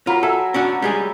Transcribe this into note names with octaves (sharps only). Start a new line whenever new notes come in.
F#3 F4 A#4 B5
A4 E5 G#5 E6
C#4 D4 F#4
G3 G#3 G#4